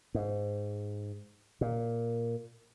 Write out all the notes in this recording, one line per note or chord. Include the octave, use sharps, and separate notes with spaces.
G#2
A#2